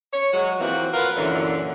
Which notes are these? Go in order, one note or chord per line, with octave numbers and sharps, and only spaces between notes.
C#5
F#3 G#3 F#4
E3 F3 A#3 C4 F#4
F4 F#4 A#4 B4
F#2 A#2 D3 E3